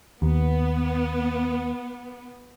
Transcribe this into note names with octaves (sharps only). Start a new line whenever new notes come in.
D#2 B3